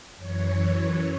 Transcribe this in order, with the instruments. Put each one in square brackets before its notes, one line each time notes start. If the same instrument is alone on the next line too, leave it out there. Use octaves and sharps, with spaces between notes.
[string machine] F#2 E3 C#5